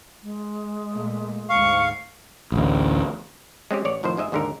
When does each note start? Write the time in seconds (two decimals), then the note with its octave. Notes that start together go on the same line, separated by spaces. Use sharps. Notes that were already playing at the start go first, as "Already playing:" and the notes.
0.23 G#3
0.91 A#2 A3
1.49 D2 G#2 F5 C#6
2.52 A1 D2
3.71 G#3 C4 C#4 G4
3.85 A1 C#5 D5
4.03 F2 A2 D#3 F3 C5
4.17 G#2 G#3 D#5 E5
4.32 D#2 G#2 D3 D#4 A#4